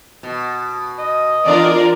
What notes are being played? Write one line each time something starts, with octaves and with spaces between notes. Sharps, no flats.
B2
D#5
E2 D4 F4 A#4 D5